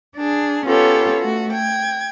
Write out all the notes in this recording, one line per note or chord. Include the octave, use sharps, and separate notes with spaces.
D4 G#4
B3 C#4 F4 G4 A4 C#5
A3 F#4
G5 G#6